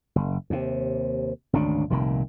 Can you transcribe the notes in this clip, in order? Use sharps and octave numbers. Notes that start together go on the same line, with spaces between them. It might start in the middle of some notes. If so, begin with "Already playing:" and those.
F#1
D#2 C3
G#1 D2 C#3 D4
F1 C2 A#2 D#3